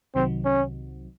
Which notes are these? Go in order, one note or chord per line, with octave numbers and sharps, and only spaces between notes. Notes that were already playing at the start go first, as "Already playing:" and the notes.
C2 C3 D#3 F#3 C4
C#4